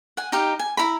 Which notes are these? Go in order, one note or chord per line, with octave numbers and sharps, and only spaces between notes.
F#5 G#5
D#4 G4 F5
G#5
E4 A#5 B5